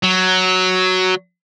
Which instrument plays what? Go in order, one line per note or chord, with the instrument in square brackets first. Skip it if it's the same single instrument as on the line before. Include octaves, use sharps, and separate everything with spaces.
[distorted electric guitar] F#3